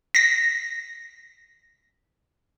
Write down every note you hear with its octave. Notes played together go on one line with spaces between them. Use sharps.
A#6 B6